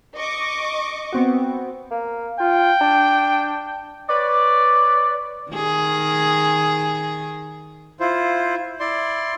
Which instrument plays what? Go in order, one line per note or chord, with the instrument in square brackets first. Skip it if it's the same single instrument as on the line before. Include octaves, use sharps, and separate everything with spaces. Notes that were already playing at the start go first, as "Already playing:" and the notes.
[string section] D#5 C#6 D6
[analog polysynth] B3 C4 F#4
[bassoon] A#3
[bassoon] F4 [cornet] G5
[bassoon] D4
[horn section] B4 C#5 D5
[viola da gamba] D#3 G#4
[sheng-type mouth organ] E4 F4 C5
E4 D5 C6